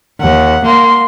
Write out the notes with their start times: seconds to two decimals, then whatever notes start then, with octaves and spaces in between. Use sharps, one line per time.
0.21 D#2 F#5
0.66 A#3 C6